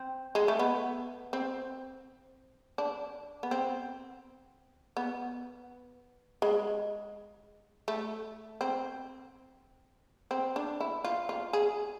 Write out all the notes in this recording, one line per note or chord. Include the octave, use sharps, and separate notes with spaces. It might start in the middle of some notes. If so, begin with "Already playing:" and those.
Already playing: C4
G#3
A3
B3
C4
D4
B3
C4
B3
G#3
A3
C4
C4
D4
E4
F4
F4
G#4